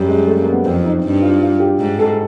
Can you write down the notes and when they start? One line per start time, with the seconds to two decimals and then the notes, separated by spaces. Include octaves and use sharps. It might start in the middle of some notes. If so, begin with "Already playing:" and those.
Already playing: F#2 G3
0.08 G#3
0.27 A3
0.41 A#3
0.53 B3
0.66 F2 C4
0.85 D#4
1.04 G2
1.22 F4
1.42 F4
1.60 G4
1.79 G#2
1.99 A4